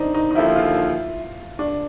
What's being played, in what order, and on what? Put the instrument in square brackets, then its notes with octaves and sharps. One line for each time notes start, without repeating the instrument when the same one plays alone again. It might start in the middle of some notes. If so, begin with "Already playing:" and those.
Already playing: [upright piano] C4 D4 D#4
D#4
D#4
[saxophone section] D#2 D3 F3 [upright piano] E4
[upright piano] F4
D4